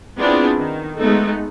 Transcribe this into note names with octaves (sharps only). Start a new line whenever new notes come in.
B3 C4 D4 E4 F4 G#4
D#3
G#3 A3 B3 D#4 A4